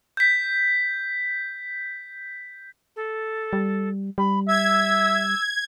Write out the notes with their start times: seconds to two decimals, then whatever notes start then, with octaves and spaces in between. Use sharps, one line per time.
0.17 G6 B6
2.96 A4
3.53 G3
4.18 G3 B5
4.48 E5 E6 G#6